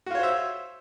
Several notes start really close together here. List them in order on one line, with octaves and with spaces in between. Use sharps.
F#4 F4 C#5 C5 E5